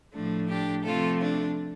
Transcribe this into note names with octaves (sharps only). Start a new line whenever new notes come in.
A2 F3 A3 D4
D4 G4
C3 F3 A3 F4 A4
D4